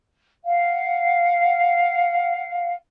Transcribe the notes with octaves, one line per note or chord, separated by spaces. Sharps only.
F5 F#5